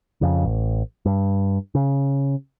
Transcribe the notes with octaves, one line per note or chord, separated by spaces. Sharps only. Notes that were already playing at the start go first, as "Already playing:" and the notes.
F2 C#3
A1
G2
C#3